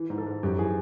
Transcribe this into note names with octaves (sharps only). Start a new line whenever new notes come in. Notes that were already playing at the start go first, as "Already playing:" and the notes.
Already playing: E3
G#2
A4
G#2
F#2 G4
E3 G#4